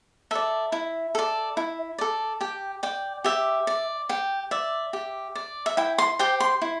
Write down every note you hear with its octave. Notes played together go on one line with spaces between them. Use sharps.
A4 D5 E5
E4
A4 D5
E4
A4 D5
G4 G5
D5 G5
G4 E5
D5
G4 G5
D5 E5
G4
D5
E5
E4 G5
C6
G4 C5 G5
C6
E4